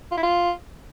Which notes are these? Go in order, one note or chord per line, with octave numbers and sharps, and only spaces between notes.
F4
E4
F4